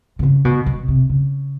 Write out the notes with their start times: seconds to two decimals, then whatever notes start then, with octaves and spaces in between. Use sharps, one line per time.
0.19 C3
0.23 C#3
0.45 B2
0.66 B2
0.88 C3
1.09 C#3